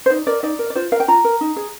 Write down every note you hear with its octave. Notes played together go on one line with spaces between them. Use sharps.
C5
D#4 D5
A#4 D5
D#4 D5
A#4
D5
F4 C5
A#4 F5
G5
F4 A#5
A#4
D#4
G#4